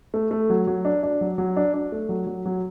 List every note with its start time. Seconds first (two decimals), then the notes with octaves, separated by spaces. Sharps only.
0.14 A3
0.31 A3
0.50 F#3
0.67 F#3
0.85 D4
1.03 D4
1.21 F#3
1.38 F#3
1.57 D4
1.74 D4
1.92 A3
2.09 F#3
2.27 F#3
2.46 F#3